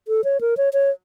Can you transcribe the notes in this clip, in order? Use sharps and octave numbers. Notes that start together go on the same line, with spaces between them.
A4
C#5
A#4
C#5
C#5